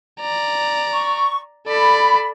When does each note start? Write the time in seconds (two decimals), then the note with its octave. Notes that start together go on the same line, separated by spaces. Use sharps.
0.21 D5 A#5
0.92 C#6
1.67 A4 D5 B5